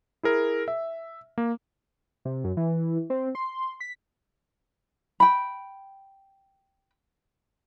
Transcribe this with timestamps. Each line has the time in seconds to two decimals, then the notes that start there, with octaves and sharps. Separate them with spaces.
0.23 E4 G#4 A#4
0.68 E5
1.38 A#3
2.25 C3
2.44 F#2
2.57 E3
3.10 C4
3.35 C6
3.80 B6
5.20 G5 B5